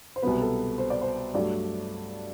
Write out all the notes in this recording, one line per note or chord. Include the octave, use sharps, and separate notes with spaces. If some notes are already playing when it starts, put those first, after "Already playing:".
C5
C2 B2 F#3 B3 B4
A4
C5
D5
C5
G2 F#3 A3 D5